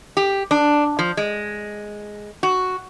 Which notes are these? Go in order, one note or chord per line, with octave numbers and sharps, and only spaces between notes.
G4
D4
F3
G#3
F#4